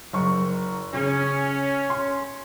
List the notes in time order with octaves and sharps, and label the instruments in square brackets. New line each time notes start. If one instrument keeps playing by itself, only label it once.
[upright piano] F#1 C#6
[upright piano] C#3 [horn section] C#4
[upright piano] C6